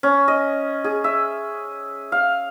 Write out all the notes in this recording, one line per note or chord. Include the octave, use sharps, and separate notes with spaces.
C#4
D#5
G#4
E5
F5